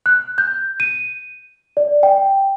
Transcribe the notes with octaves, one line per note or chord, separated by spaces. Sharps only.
F#6
G6
D#7
D5
G5